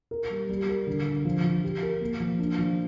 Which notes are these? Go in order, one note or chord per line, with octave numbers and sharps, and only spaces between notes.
A#4
G3
G3
A#4
D3
D3
F3
F3
G4
A#4
A#3
F3
D4
F3